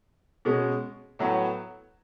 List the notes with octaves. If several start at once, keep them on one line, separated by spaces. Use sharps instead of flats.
B2 G#3 C#4
A2 F#3 B3